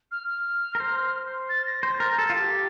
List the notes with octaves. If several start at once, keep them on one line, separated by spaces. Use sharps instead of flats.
F6
F6
A#4
C5
A6
A#6
C5 A#6
A#4 A6
G6
A4 A6
F4
G4